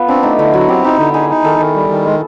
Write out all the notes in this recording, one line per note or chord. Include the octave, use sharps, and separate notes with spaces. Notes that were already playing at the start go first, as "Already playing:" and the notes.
Already playing: B3 F4
C4 D4
A3 D#4
D3 E4
F#3 F#4
C4 G4
D#4 G4
D3
D#4 G#4
D#4
D#3 A4
D#3
G3
D#3
G#3